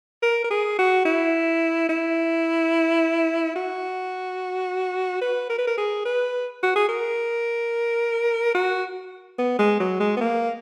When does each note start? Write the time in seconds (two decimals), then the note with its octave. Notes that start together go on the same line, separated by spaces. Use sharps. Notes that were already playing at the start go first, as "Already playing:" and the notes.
0.23 A#4
0.44 A#4
0.51 G#4
0.79 F#4
1.06 E4
1.89 E4
3.56 F#4
5.21 B4
5.50 A#4
5.58 B4
5.67 A#4
5.78 G#4
6.05 B4
6.63 F#4
6.76 G#4
6.89 A#4
8.55 F#4
9.38 B3
9.59 G#3
9.80 F#3
10.00 G#3
10.17 B3
10.21 A#3